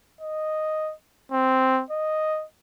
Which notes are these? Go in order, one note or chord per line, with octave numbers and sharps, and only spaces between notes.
D#5
C4
D#5